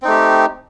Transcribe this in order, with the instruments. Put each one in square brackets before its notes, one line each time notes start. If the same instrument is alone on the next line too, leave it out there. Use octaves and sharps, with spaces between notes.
[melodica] C4
D#4
A3
G4